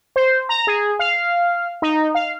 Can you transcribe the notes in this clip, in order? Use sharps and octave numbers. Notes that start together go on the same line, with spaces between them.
C5
A#5
G#4
F5
D#4
F5